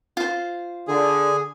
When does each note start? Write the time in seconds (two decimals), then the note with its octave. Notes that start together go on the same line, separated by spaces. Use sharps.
0.17 F4 C5
0.88 D3 G#4